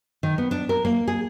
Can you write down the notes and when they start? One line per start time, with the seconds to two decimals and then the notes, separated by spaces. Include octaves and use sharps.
0.23 D#3
0.38 B3
0.51 D4
0.69 A#4
0.85 A#3
1.08 G#4